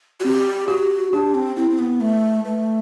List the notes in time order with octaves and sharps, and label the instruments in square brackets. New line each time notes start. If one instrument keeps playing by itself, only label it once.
[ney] F#4
[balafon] C4 [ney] G4
[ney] F#4 [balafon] G4
[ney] D4 [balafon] G4
[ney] C4
[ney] C4 [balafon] E4
[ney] C4
B3
[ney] A3 [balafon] B4
[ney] A3 [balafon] B4